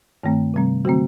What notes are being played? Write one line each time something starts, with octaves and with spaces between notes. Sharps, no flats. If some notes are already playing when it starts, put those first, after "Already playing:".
G2 D#3 A3 C4
C3 G3 C4
D3 F#3 A3 C4 F#4